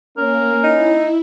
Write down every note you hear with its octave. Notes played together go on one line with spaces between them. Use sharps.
A#3 C#4 A#4
D#4 E4